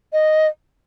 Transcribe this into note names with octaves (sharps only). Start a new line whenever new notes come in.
D#5